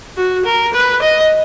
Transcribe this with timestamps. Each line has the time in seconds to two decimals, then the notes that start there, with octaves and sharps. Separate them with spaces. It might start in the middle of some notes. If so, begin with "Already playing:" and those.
0.17 F#4
0.46 A#4
0.74 B4
1.02 D#5